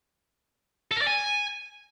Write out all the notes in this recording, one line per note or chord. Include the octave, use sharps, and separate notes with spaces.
A4
A#4
D5
G#5